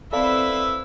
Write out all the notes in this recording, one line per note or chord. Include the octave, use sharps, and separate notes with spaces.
C4 E4 A4 B4 D5 E5 F5